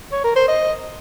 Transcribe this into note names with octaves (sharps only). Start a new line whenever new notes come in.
C#5
A#4
C5
D#5